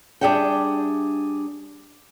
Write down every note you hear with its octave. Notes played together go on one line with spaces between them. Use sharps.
G3 D4 G#4 E5 F#5 G5